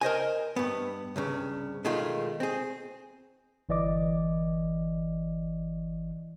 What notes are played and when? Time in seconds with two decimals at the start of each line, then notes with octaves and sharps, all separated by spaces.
0.01 A#4 C5 D#5 G#5
0.56 G2 B3
1.16 C2 G2 C#3
1.85 B2 D#3 G#3 A3 F4
2.40 C4 G#4
3.69 G1 E3 D5 D#5 D6